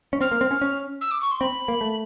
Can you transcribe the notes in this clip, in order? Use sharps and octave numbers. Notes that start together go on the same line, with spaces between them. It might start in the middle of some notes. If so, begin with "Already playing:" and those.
C#4
C4 F6
A#3
C4
C#4
C#4
E6
D6
C#6
C6
C4 B5
A#3
A3